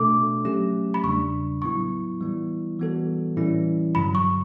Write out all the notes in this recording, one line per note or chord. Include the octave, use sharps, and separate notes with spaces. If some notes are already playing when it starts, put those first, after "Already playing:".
Already playing: B2 A3 D4 A4 D6
F#3 A3 C#4 G4
B5
E2 C#3 G3 D4 C#6
A2 F#3 B3 E4 C#6
E3 G3 B3 E4
E3 G3 B3 F#4 A4
A2 E3 G3 C#4 E4
G2 D3 F#3 B5
C#6